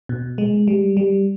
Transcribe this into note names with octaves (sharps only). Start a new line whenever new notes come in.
B2
G#3
G3
G3